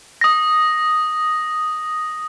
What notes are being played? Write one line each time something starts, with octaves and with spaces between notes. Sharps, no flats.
D#6 A#6